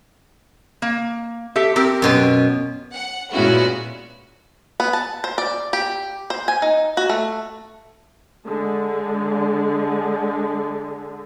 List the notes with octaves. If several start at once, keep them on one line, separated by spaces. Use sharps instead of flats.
A#3
G4 A4 E5
C4 G4 A#4
F#2 B2 C6
F#5
A#2 G#3 B3 C#4 E4 F#4
B3
A5
C5
D5
G4
C5
G#5
D#4
F#4
A3
D3 G#3